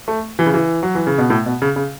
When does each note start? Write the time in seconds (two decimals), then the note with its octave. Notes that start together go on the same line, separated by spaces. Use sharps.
0.08 A3
0.39 E3
0.46 C#3
0.54 E3
0.83 F#3
0.95 E3
1.07 C#3
1.18 B2
1.30 A2
1.46 B2
1.62 C#3
1.76 C#3